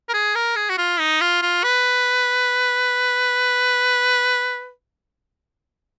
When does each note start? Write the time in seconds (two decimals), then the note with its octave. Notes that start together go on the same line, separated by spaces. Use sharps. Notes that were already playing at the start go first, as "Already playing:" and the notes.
0.09 A#4
0.14 G#4
0.35 A#4
0.56 G#4
0.69 F#4
0.78 F4
0.99 D#4
1.21 F4
1.42 F4
1.63 B4